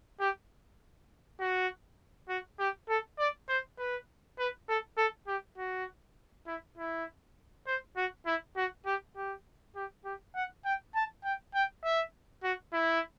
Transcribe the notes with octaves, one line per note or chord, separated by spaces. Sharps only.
G4
F#4
F#4
G4
A4
D5
C5
B4
B4
A4
A4
G4
F#4
E4
E4
C5
F#4
E4
F#4
G4
G4
G4
G4
F#5
G5
A5
G5
G5
E5
F#4
E4